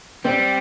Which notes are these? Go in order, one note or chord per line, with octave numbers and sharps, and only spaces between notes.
G3 C4